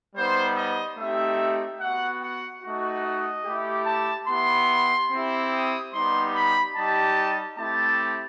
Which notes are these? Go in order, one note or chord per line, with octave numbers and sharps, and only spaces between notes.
G3 B3 D#4 C5
D#5
A3 C4 D#4 G4 E5
B3 F#4 F#5
F#5
A3 D#4 F#4
D#5
A3 E4 G4
A5
B3 E4 G4 C6
C4 E4 G4
D#6
G3 B3 D#4 G4 C6
B5
G3 D#4 G4 A5
A3 C4 E4 G4 A5